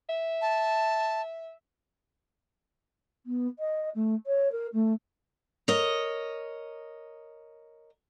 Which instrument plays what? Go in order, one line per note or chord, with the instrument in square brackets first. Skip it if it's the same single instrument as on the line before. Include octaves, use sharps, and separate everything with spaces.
[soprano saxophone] E5
[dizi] A5
[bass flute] B3
D#5
A3
C#5
A#4
A3
[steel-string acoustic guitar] A#4 C#5 D#5